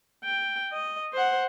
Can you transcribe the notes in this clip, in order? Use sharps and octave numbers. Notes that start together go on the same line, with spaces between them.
G5
D#5
C5 F#5